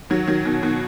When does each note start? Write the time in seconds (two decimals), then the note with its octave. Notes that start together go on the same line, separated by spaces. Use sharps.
0.10 D#3 F#3
0.27 D#3 F#3
0.45 B2 D#3
0.62 B2 D#3